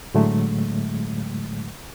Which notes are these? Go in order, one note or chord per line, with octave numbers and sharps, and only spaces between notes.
A2 D3 F#3 G#3 A3